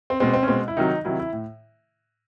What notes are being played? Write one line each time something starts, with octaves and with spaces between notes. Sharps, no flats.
C4
B2 G#3 C4
C4
C#4
B2 G#3 C4
E4
C3 D#3 F#3 D#4
C3 D#3 F#3 E4
E4
A2